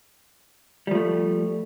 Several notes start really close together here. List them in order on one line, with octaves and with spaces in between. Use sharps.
G3 F3 A3